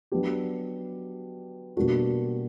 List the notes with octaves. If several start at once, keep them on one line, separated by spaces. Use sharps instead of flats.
F#3 B3 D4 G4
B2 G3 A#3 D4 F#4